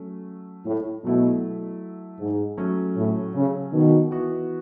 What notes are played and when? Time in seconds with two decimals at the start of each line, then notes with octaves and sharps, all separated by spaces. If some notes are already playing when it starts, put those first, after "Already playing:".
Already playing: F#3 A3 C#4
0.66 A2
1.04 B2 F#3 A3 E4
2.19 G#2
2.57 F#3 A3 C#4
2.96 A2
3.34 C#3
3.72 B2 D#3
4.11 E3 B3 F#4